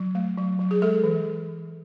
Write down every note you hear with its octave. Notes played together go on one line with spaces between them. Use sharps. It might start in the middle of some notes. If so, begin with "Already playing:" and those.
Already playing: F#3
A3
F#3
F#3
G#4
G#3 A4
E3